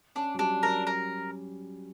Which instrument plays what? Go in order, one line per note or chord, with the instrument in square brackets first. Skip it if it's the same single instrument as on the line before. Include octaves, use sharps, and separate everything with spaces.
[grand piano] C#4 [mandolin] D4
[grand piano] F#3
[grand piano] G3 [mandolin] D4
[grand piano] F#3 [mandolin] A#4
[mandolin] A#4